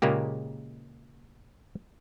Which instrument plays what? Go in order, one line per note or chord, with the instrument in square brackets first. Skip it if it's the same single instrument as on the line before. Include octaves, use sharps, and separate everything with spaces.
[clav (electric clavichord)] A#2 C#3 G#3 A#3 G4